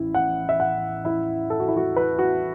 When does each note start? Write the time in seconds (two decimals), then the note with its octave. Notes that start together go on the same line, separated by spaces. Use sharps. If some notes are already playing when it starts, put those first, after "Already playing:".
Already playing: A1 E4
0.14 F#5
0.49 E5
0.60 F#5
1.05 E4
1.50 A4
1.60 F#4
1.68 E4
1.77 F#4
1.96 B4
2.19 F#4